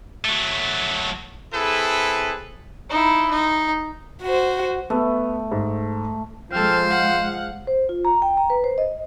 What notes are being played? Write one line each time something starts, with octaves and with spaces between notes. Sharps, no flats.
F#3 A3
C4 E4 G#4 A4 B4
D#4 E4
D#4
F#4 C5
A3 B3
G#2
F3 G#3 C4 A4 C5 F6
F5 F#5
C5
F4
A#5
G5
A#5
B4
C5
D#5